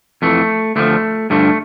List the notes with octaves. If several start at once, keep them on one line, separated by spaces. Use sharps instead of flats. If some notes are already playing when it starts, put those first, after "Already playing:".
F2 E3 A3
D2 D3 F3 A3
G2 D3 F3 A3